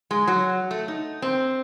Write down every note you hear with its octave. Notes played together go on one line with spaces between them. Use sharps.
G#3
F#3
A3
D#4
C4